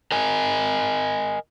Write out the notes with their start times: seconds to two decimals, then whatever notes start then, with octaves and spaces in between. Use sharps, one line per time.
0.12 A#4 D#5 G#5